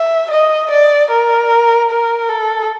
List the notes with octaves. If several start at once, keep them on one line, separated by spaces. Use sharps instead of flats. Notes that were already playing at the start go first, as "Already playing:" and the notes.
Already playing: E5
D#5
D5
A#4
A#4
A4